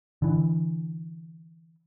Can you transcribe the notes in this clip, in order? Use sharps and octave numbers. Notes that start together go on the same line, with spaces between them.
D3 E3